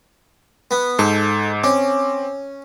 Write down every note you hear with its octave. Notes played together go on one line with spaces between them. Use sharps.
B3
G#2 A4
C4 C#4 D6